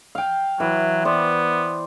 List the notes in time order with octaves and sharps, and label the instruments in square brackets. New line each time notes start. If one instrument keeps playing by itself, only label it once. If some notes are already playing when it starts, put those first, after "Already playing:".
[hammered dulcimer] F5 G5
[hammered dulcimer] E3 [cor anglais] F#3
[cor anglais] B3 [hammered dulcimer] C5 D5